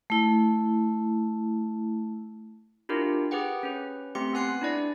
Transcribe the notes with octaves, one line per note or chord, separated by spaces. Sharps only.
A3 E4
D4 E4 F4 G4 A#4
G4 G#4 B4 F#5 G5
C#4 B4
A3 C4 G4 C6 C#7
B3 B4 G#5 F#6 C7
D4 E4 D5